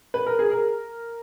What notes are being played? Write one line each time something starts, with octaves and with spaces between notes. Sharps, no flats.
B4
A#4
G#4
A#4